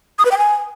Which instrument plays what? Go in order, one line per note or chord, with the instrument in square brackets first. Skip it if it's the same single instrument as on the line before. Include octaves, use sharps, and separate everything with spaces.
[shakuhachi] D#6
B4
G5
G#5